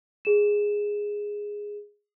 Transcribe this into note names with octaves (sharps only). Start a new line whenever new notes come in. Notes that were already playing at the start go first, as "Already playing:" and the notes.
G#4 E7